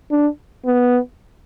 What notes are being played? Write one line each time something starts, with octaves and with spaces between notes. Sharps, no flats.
D4
B3